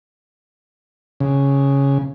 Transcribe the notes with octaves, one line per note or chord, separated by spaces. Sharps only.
C#3